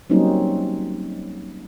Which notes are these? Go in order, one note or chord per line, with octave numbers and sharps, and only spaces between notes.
F#3 G3 A#3 C4 C#4 D#4